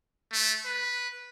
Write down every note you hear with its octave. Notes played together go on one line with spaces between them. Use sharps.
A3
B4